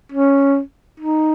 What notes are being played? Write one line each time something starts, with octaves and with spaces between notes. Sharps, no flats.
C#4
D#4